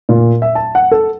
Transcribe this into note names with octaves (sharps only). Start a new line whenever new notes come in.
A#2
E5
A5
F#5
A4